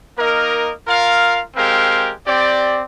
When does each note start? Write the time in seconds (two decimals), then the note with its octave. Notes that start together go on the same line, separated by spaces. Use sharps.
0.17 A#3 D#4 A#4 D#5
0.87 F4 A#4 F5
1.56 G#3 C4 G4 A#4 F5
2.26 C4 G4 D5